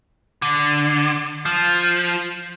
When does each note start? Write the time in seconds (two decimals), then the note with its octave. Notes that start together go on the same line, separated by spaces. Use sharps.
0.42 D3
1.46 F3